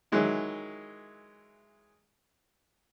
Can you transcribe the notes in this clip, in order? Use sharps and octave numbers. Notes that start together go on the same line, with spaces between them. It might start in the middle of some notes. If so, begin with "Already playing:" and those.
D#3 E3 F#3 G#3 E4